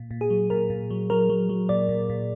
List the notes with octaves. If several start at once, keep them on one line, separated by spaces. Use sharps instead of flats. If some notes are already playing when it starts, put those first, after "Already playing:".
Already playing: A#2
A#2
G#4
F#3
A#2 A#4
A#2
F#3
F#3 A#4
F#3
F#3
A#2 D5
A#2
A#2